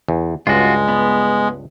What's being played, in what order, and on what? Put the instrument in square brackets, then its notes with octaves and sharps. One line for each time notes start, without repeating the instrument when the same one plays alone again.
[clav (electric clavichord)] E2
[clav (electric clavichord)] C#2 G2 [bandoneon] G#3 [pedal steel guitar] F4 F#4
[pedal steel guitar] B3